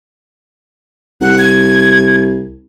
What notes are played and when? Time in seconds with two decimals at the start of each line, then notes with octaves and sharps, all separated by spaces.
1.21 C2 F#5
1.38 G#6